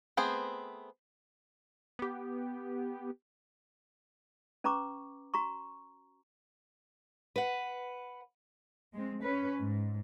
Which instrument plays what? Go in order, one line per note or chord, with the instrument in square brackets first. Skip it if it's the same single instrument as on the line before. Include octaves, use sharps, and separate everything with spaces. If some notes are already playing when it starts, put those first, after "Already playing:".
[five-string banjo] A3 B3 C4 G#4 C5
[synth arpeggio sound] B3 G4
[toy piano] C#4 B4 A#5 C#6 D6
F#4 A#5 C#6
[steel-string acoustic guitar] B4 F#5
[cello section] G#3 C4
C#4 B4
G#2